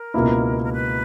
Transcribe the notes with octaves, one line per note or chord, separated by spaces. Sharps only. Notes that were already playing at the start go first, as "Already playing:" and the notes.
Already playing: A#4
C#2 B2 A#3 E4
A#4
B4